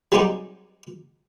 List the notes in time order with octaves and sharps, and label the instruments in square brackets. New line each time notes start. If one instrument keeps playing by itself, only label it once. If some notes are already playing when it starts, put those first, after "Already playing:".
[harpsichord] F#3 G3 C4 D#4 G4 G#4